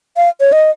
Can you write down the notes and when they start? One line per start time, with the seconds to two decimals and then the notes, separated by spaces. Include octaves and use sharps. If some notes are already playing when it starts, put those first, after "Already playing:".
0.17 F5
0.41 C#5
0.52 D#5